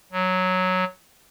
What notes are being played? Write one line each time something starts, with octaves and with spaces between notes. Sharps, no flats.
F#3